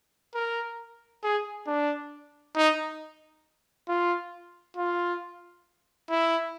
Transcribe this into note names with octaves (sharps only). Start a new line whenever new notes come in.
A#4
G#4
D4
D#4
F4
F4
E4